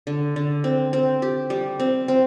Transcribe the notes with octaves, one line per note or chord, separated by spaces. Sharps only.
D3
D3
C4
C4
G4
G3
C4
C4